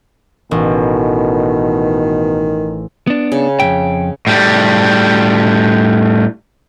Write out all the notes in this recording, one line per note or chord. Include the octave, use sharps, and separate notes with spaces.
A1 B2 D#3
B3 D4
C#3
F2 G#2 E5 G5
A2 G3